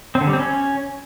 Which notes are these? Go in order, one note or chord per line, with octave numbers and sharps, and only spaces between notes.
C4
D3
G3
C4
C#4